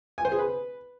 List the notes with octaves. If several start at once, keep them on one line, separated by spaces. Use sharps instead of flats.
G#5
C5
G#4
B4